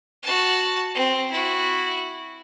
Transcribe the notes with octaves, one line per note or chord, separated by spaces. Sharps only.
F#4 A5
C4
E4 F#4